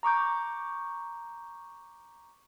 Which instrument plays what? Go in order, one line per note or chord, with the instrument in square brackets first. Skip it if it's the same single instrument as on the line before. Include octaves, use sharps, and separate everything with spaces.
[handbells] A#5 C#6 D6 G6